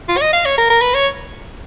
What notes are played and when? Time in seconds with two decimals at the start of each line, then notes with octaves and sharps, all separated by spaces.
0.09 F4
0.17 C#5
0.22 D#5
0.33 F5
0.45 C#5
0.58 A#4
0.70 A#4
0.82 B4
0.94 C#5